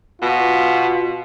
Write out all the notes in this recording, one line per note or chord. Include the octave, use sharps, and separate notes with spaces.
B2 F4